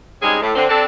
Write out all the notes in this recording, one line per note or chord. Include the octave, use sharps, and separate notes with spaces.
G3 G#3 C4 C#4 D#4 G#4
A2
D3 C4
C4 D4 A4